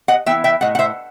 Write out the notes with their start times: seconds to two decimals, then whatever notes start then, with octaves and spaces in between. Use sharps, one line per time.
0.08 D#5 F#5
0.26 E3 B3 E4 E5 G5
0.44 E5 G5
0.61 A2 D#5 F#5
0.75 F#5
0.79 C5 E5